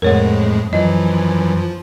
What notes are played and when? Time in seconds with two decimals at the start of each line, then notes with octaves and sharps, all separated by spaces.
0.02 F2 A2 G#3 A#4 C#5 F#5
0.73 F#2 E3 F3 D#5
1.57 F3